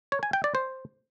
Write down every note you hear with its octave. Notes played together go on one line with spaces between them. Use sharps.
C#5
G#5
G5
D5
C5